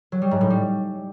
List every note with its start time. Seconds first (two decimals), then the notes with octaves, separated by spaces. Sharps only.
0.12 F#3
0.22 G3
0.31 G#2
0.41 A2
0.50 G3